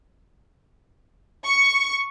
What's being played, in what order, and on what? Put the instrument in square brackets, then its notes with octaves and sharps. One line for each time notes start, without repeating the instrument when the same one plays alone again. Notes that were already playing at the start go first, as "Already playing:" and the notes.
[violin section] C#6